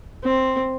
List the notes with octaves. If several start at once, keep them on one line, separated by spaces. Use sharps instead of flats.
C4